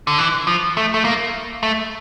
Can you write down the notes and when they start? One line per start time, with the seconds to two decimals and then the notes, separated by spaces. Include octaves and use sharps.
0.07 D3
0.19 E3
0.47 F3
0.77 A3
0.94 A3
1.05 A#3
1.63 A3